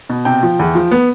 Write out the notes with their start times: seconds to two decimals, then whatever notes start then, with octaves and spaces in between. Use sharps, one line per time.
0.09 B2
0.25 C3 G5
0.43 F3
0.59 E2
0.75 F3
0.91 B3